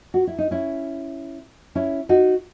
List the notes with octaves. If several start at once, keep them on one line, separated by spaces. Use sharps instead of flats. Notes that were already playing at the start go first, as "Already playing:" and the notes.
F#4
E4
D#4
C#4 E4
C#4 E4
D#4 F#4